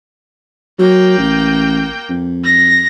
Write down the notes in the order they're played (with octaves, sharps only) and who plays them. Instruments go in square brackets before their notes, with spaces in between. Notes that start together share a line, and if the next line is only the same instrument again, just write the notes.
[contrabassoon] F#3 [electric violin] A#3 G5
[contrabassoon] A1
F2
[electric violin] A#6